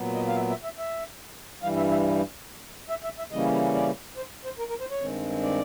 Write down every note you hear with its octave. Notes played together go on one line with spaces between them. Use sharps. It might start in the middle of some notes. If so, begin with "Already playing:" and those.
Already playing: A#2 F#3 B3
D#5
F5
E5
E5
E5
E5
G2 E3 G3 F5
E5
E5
E5
E5
E5
C#3 E3 G3 A#3 C#4 D#5
D5
C5
C5
A#4
A#4
C5
C#5
G2 D#3 G#3 C4
D5